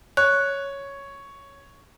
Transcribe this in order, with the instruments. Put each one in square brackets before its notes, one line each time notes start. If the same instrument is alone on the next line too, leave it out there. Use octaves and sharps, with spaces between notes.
[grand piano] C#5 [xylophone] F#6